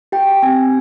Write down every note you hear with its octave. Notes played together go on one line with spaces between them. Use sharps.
G4 G5
C4 G#5